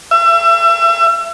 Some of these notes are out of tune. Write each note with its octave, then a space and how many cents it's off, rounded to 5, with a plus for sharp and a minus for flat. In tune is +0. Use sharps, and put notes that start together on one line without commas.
E5 +35